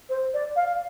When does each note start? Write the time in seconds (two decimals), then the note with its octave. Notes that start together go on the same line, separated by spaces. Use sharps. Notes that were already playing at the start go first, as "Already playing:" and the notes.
0.09 C5
0.34 D5
0.56 F5